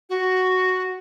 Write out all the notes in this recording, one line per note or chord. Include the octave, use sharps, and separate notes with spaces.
F#4